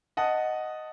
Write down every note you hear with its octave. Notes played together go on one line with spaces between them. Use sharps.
D#5 F#5 A5 D#6